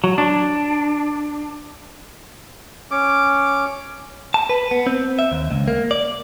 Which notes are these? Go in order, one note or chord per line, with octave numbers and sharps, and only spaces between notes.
F#3
D4
C#4 D6
A5
B4
B3
C4
E5
D#2
C#2
A#3
D5